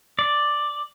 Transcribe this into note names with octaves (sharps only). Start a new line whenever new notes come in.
D5